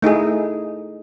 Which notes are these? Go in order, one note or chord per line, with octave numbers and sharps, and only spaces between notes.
A3 D#4 E4 G#4